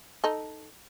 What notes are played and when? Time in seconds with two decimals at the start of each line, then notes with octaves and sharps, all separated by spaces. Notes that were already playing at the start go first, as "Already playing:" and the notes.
0.24 D#4 A4